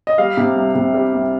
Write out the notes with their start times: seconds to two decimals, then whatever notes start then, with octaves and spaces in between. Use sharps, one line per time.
0.07 D#5
0.18 G3 F5
0.37 C3
0.56 C2
0.75 C3
0.94 G3
1.13 C2